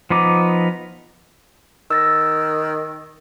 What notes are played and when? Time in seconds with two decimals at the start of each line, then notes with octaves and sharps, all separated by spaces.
0.10 F3 B3 D#4 D6
1.91 D#3 E6 A6 A#6